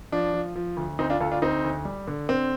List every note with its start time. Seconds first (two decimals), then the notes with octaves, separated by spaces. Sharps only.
0.12 F3 D4
0.34 F3
0.56 F3
0.77 D2
0.99 D2 C4 D#4
1.10 D4 F4
1.20 D2 F4 A4
1.31 D4 F4
1.42 D2 C4 D#4
1.64 D2
1.85 G3
2.07 D3
2.29 D3 C4